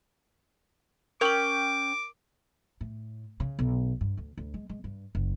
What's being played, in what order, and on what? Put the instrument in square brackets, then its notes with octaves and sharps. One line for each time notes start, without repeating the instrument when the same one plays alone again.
[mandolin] C#4 G5 [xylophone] A#4 F#7 [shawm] D6
[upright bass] A2
C#3
B1
G2
D2
D2
G#3
G#3
G2
F#1